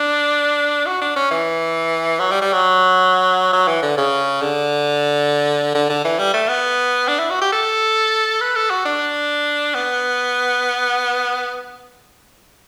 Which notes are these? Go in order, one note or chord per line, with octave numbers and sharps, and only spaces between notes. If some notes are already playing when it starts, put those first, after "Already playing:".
Already playing: D4
F#4
D4
C#4
E3
F#3
G3
G3
F#3
F#3
E3
D3
C#3
D3
D3
D3
E3
G3
A3
B3
D4
E4
F#4
G4
A4
B4
A4
F#4
D4
B3